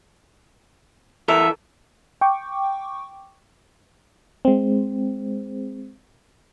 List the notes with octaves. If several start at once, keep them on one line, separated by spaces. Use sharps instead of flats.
E3 A4 A#4 E5
G5 C#6 D6
G#3 C4